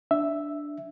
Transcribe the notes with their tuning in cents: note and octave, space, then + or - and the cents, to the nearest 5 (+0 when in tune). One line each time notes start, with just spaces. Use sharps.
D4 +0 E5 +0